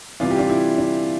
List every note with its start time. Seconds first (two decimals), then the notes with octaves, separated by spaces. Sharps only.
0.20 C3 E3 G3 F4
0.31 G4
0.39 D4 F4
0.50 E4
0.78 D4